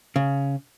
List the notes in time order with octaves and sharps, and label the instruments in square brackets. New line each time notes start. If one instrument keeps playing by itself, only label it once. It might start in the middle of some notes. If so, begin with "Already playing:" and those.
[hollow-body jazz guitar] C#3